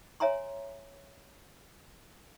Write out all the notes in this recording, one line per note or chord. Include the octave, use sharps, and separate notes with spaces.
C#5 E5 G#5 A#5 C6